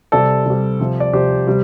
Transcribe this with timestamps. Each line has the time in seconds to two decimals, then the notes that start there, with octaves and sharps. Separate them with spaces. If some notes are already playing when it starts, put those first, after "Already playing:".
0.12 C3 G3 A4 D5
0.46 C3 G3
0.80 C3 F3
1.00 D5
1.13 C3 F3 G4 C5
1.47 C3 G3